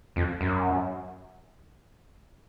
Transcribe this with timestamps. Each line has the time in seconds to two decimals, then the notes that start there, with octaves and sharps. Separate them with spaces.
0.16 F2
0.41 F#2